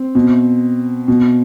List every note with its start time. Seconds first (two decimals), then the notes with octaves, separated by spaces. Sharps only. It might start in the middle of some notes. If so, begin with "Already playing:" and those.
Already playing: C4
0.15 B2
1.08 B2